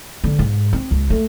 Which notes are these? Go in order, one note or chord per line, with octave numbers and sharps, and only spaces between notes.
D3
G#2
C4
C#2
A3